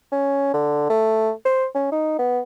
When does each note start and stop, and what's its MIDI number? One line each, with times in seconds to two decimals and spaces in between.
0.11 0.50 61
0.54 0.89 50
0.90 1.31 57
1.45 1.66 72
1.75 1.87 61
1.92 2.16 63
2.19 2.40 59